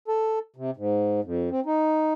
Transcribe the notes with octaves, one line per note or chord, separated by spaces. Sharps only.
A4
C3
G#2
F2
C4
D#4